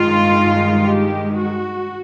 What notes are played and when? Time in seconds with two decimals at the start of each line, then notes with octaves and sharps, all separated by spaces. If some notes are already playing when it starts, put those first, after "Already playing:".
Already playing: G2 D#3 G#3 F4
0.83 G4
1.38 F#4